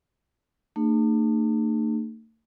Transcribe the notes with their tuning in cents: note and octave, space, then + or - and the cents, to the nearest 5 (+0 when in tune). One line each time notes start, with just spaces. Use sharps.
A3 +40 D4 +45 G#4 -15